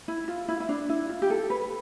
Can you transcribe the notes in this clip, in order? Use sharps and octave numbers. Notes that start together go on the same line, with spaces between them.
E4
F4
E4
E4
D4
E4
F4
G4
A4
B4